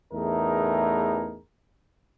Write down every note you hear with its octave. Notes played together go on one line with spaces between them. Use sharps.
A1 E2 A3 D#4 G#4 A#4